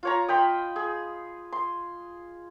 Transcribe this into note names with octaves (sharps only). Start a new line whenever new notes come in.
F4 C#5 A#5
D#5 G5 B5 C6
G#4
C6